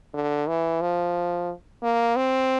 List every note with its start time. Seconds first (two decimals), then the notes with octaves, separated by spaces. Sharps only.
0.14 D3
0.48 E3
0.81 F3
1.83 A#3
2.16 C4